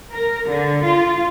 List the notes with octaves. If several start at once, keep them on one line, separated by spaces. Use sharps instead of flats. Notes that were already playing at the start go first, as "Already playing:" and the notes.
A#4
D3
F4